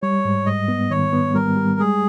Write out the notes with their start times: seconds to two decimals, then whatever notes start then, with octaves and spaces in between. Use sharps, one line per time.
0.02 G3 C#5
0.25 G#2
0.46 G#2 D#5
0.68 B3
0.90 D#3 C#5
1.13 B3
1.34 G3 A#4
1.57 G3
1.79 G#3 G#4